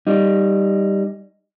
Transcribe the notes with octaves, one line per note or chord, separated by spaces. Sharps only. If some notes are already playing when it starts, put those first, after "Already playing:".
G3 D#4